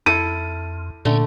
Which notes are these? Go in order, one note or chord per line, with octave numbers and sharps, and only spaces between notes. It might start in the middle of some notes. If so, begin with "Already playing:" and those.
F2 E4 A4 D#7
A#2 D3 A3 C#4 G5 G#5